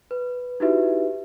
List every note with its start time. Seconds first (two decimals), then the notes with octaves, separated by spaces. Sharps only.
0.11 B4
0.60 D#4 E4 F#4 G4 B4 E5